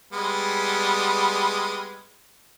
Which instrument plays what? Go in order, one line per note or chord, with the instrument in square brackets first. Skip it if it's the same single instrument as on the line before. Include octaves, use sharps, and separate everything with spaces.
[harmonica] G3 G#3 B3